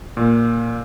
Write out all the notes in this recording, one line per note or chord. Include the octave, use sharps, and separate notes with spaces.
A#2 A#3